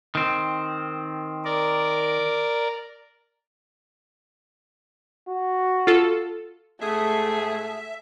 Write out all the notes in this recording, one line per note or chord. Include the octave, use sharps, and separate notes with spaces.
D#3 C4
A#4 D5
F#4
F4 A4
G#2 A3 F#4 G#4 E5